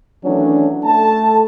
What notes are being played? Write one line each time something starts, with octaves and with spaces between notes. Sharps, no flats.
D#3 E3 F#3 A3 C#4 D4
A3 A4 A5